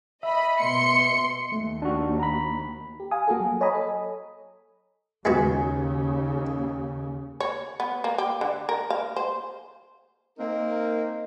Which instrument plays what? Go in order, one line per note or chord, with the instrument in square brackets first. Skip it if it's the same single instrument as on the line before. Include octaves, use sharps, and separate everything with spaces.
[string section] D#5 B5 [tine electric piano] E5
[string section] B2 C6 C#7
[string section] D#2 [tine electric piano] A3
[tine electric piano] D4 F#4
A#5 B5
[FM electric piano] G4
F5 G#5 D#6
A#3 F#4 G#4 A4
F#3
C#5 D#5 G#5 A#5 B5 D#6
A4
[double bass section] D#2 C#3 [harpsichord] G#3 B3 F#4
[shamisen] C#5
B3
A#3
G4
D3
A#4
F5
C5
[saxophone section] A#3 C4 D#4 A#4